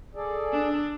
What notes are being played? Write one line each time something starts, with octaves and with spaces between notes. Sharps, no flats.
G#4 A4 D5
D4